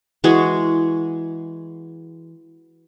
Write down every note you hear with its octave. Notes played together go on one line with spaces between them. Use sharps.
E3 G#3 F#4 G#4